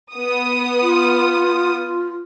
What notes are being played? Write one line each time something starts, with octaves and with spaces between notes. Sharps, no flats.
B3 D#6
F4